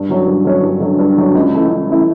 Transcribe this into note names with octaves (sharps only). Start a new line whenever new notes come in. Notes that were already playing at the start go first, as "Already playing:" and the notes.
Already playing: G2
D3 F#3 C#4
G2
D3 F#3 C#4
G2
D3 F#3 C#4
G2
D3 F#3 C#4
C#2
C#3 E3 A3 E4
C#2
C#3 E3 A3 E4